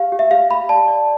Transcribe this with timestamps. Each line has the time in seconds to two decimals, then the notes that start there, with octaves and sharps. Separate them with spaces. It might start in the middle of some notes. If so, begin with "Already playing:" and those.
Already playing: G4 F5
0.12 G4
0.19 E5
0.31 G4 F5
0.50 G4 B5
0.69 D5 A5
0.88 D5